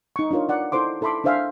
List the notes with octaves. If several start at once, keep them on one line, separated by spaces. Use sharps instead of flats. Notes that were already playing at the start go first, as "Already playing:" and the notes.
D#4 C#6
D4 D#4 F4 A#4 C#5
D5 F#5
D#4 E4 A4 C5 C6 D6
E4 A4 E5 B5 C6 D6
D4 A4 C5 E5 F5 G#5